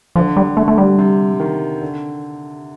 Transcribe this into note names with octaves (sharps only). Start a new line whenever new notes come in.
D3 F3
G3
D3 A3
A3
G3
C3
D#3
D3